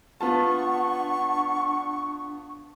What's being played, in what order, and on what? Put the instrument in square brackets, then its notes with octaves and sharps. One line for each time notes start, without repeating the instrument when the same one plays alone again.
[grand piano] B3 F4 A5 [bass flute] D4 [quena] F#5 [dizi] C#6